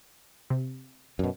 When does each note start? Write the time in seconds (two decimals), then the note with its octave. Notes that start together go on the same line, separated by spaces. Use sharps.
0.50 C3
1.19 F#2 B2